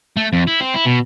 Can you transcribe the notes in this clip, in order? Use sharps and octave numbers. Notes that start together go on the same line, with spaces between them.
A3
F2
E4
C4
E4
B2